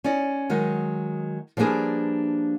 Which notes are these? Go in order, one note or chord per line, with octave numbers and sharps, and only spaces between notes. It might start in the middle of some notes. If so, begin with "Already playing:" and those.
C#4 D#4 D5
D#3 F#3 G#3
F3 G3 A#3 D4 G#4 B4